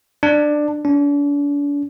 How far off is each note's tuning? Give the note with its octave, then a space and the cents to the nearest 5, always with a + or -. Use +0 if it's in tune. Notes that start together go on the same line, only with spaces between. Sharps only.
D4 +15
D4 -40